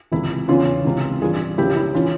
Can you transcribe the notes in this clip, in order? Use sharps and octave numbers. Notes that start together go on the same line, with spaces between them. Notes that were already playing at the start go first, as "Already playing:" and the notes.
C#2 C3 E3 E4
E2 C#3 E3 C#4 F4
C#2 C3 E3
G2 E3 F4 G#4
C#2 C#3 F3 E4 G4
E4
E3 C#4 F4